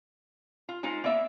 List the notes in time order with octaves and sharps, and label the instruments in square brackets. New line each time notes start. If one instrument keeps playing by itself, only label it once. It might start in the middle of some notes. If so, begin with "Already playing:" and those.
[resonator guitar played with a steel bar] F4
G#3 D#4 F4 C5
A#3 B3 D5 E5